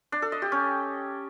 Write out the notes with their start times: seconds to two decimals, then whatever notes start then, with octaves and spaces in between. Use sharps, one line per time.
0.12 D4
0.22 A4
0.32 D#5
0.42 G4
0.52 C#4